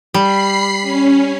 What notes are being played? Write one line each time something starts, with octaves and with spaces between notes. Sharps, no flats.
G3 B5 C7
C#4